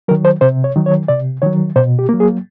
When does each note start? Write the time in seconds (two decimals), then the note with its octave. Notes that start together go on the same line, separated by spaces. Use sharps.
0.08 D#3 F#3 A#4
0.25 C5
0.41 C3 C5
0.64 C#5
0.76 D#3 F#3
0.86 C#5
1.08 C3 D5
1.42 D#3 F#3 C#5
1.76 B2 C5
1.99 G4
2.09 F#3 A#3
2.20 G#4